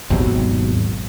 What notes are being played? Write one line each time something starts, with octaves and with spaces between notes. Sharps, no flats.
G#1 D#2 B2 F#3